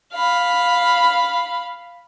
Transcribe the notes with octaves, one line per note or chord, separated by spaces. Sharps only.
F5 B5